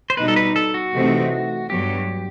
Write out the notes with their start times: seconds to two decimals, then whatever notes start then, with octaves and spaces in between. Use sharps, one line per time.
0.10 C5
0.17 B2 G3 D#4 B4
0.28 A4
0.36 B4
0.56 A4
0.74 F#4
0.93 C3 E3 A3 C4 D#4
1.70 G2 F#3 B3 G4